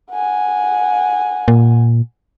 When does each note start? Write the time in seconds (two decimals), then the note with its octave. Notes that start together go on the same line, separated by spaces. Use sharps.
0.12 F#5 G#5
1.48 A#2